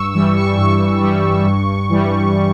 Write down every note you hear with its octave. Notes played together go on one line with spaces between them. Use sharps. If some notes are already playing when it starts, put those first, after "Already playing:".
Already playing: G2 C#6 E6
E3 G3 E6
C#6
G2 C#6
E3 G3
G2
E3 G3